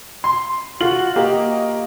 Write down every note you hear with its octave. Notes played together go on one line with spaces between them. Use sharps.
C6
F4 F#4 F#7
A#3 G4 D#5